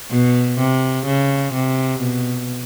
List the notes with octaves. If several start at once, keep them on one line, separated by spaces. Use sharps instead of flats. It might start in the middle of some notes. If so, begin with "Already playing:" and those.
B2
C3
C#3
C3
B2